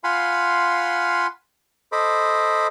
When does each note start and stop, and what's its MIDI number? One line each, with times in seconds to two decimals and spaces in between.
0.04 1.27 65
0.04 1.27 77
0.04 1.27 78
0.04 1.27 80
0.04 1.27 83
0.04 1.27 84
1.92 2.67 69
1.92 2.67 72
1.92 2.67 75
1.92 2.67 83
1.92 2.67 86